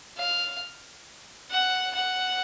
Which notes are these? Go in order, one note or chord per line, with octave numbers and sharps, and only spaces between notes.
F5
F#5
F#5